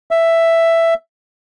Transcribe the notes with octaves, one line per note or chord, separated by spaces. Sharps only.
E5